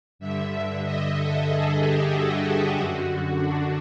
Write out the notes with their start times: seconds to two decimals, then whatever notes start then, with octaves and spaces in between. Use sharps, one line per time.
0.19 G2 D3 E5
0.83 D#5
1.15 A4
1.47 G#4
1.79 G4
2.11 F#4
2.75 F#2 D3
3.39 D4